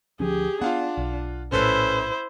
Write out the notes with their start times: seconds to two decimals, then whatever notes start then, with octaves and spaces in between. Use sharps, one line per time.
0.20 D2 F3 C#4 G4 G#4
0.62 B3 D4 F4 F5 F#5
0.98 B1
1.52 A#1 A2 C#4 E4 A4 B4 C5